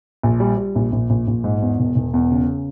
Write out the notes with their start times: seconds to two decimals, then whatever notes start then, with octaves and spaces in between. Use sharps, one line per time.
0.23 A#1
0.40 G3
0.57 G3
0.75 A#1
0.92 A#1
1.10 A#1
1.28 A#1
1.44 G#2
1.62 E2
1.79 E1
1.96 E1
2.14 E2
2.31 C#3